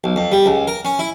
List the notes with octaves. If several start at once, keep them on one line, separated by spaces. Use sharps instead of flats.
B1
F2
G3
C#2
A#4
C#4
E4